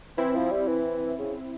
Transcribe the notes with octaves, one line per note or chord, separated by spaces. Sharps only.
E3 C4 E4
F3
G3
E3
C#3